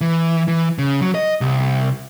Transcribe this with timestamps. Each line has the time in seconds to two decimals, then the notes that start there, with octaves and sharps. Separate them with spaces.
0.01 E3
0.48 E3
0.78 C#3
1.02 F#3
1.15 D#5
1.41 C2